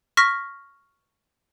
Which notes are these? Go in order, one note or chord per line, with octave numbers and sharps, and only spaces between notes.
C#6 F6 A#6 B6